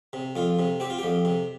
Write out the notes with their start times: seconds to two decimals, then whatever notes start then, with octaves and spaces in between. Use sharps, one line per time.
0.13 C3
0.36 F2 F4
0.59 C3
0.80 C4 G4
0.90 F4
0.99 F2 G4
1.25 C3